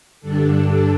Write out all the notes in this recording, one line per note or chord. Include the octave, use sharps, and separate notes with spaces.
G2 D3 G3 D4 A4